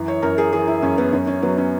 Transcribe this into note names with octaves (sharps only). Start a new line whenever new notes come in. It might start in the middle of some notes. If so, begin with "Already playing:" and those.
Already playing: F#2 E3
C#5
F#2 A#4
G#4
E3 G#4
E4
F#2 C#4
B3
F#2 C#4
C#4
F#3 B3
C#4